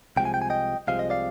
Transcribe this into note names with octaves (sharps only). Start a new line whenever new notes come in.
C2 C3 F3 G#3 G5
G#5
G5
G#5
D#5 G5
C2 C3 F3 G#3 F5
D#5
D5 F5